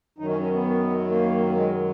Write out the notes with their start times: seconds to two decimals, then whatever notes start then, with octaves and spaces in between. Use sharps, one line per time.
0.18 F#2 D#3 F#3 D#4
0.30 C#4
0.41 C#4
0.53 B3
1.10 A#3
1.49 A#3
1.56 G#3